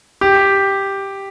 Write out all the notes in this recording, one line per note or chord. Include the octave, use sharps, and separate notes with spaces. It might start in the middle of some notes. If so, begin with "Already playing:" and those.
G4